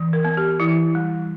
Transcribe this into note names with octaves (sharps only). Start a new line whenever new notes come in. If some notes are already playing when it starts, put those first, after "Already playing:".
Already playing: E3
A#4
B3
G4
E3 E4
G3